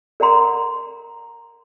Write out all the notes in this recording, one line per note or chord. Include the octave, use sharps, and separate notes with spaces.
A#4 D5 F#5 A#5 C6